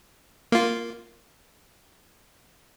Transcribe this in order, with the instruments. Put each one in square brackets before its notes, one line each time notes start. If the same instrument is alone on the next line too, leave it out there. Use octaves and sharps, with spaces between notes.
[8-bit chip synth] A#3 F4